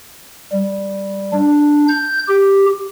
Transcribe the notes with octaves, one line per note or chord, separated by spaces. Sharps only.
G3
D4
G6
G4